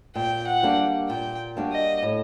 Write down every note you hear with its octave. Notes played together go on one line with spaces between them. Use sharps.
A#2 G5
F#5
G3 A#3 D4 F#4
A#2 G5
G3 A#3 D4 F#4
D#5
A2